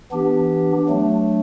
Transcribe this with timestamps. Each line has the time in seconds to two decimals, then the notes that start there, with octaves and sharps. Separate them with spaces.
0.12 E3 B3 D4 G4
0.88 F#3 A3 D4